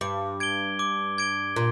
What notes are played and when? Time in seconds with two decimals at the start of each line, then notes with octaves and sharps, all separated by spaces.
0.01 G2 D6
0.40 G#6 D7 G7
0.79 D6
1.18 G#6 D7 G7
1.56 A#2